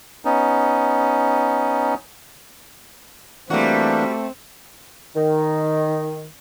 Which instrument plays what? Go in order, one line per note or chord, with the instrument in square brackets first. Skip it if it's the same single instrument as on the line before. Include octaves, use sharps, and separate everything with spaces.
[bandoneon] B3 C#4 D#4
[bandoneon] E3 A#3 D4 [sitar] G3 F#4 [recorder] A3 [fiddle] C4
[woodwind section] D#3